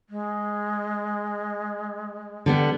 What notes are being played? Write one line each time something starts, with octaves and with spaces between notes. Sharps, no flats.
G#3
D3 G3 B3